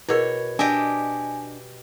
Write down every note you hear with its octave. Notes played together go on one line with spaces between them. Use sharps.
B2 E4 G#4 A#4 C#5
D4 G4 D#5 E5 G#5